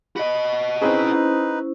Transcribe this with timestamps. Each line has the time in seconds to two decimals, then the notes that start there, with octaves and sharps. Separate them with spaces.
0.16 F#4 D#5 B5
0.82 C4 C#4 D#4 E4 G#4 B4 C5